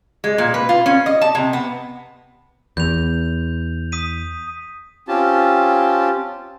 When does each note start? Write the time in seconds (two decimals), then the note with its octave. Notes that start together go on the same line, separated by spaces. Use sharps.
0.24 G#3
0.38 A#2
0.54 B4
0.69 F4
0.86 C#4
1.06 D#5
1.21 A5
1.35 C3
1.53 B3
2.77 E2 G6 F7
3.92 D#6 B6 D#7
5.08 C4 C#4 F4 G4 A5